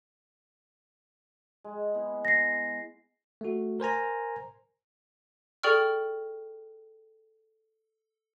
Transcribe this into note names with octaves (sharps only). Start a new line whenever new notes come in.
G#3
B3 E4
A#6 C7
A3 F#4
A#4 C5 G#5 A#5
G#4 A4 D5 G5 C#6 F6